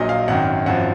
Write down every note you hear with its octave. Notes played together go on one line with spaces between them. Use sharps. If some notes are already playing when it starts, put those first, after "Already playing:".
Already playing: A#1 A#2 F#3 D#5
F5
G#1 F#2 D#3 F#5
G#1 F#2 F3 F#5